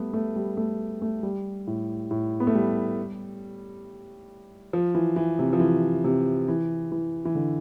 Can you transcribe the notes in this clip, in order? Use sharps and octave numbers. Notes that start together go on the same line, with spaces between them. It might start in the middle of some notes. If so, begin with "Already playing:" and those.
Already playing: G3 A3 B3
A3
G3
A3
A3
G3
A2
A2
B3
A3
G3
F3
E3
E3
C3
F3
E3
C3
E3
E3
E3
D3